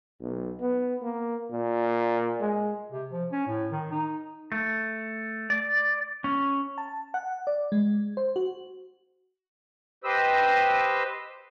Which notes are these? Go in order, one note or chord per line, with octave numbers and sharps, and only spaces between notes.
B1
B3
A#3
A#2
G#3
C3
F3
C#4
A2
D#3
D#4
A3
D5
C#4
A5
F#5
D5
G#3
C5
F#4
G4 B4 C5 D#5 E6